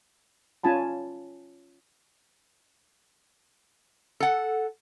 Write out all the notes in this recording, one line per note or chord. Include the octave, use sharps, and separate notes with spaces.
C#4 F4 G#5 A5 B5
A4 F#5